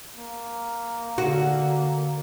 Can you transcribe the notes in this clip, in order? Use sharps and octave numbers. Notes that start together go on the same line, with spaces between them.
A#3
D3 F#4